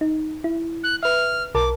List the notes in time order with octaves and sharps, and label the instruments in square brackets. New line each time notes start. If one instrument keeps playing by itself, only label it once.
[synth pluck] D#4
E4
[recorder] F#6
[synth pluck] B4 E5 [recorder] F6
[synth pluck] B1 A#4 A5 [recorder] D6